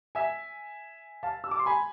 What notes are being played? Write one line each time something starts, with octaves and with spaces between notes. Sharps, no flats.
E5 G#5
F5 A5
E6
D6
C6
G#5 B5